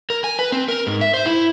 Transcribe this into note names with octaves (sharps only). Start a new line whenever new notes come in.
A#4
G#5
B4
C4
A#4
G#2
E5
C5
E4